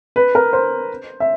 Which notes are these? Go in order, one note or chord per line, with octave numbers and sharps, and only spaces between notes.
B4
A#4
C5
E5